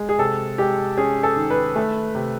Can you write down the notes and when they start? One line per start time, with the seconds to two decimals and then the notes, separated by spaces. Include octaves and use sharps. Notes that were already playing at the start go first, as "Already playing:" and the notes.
Already playing: G#3
0.09 G#4
0.18 C3 A4
0.58 G#3 G4
0.97 C#4 G#4
1.23 A4
1.36 D#3
1.50 B4
1.76 A3
2.15 C3